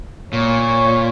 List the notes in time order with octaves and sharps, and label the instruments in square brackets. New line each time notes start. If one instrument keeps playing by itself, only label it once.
[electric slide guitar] A#2 [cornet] C#5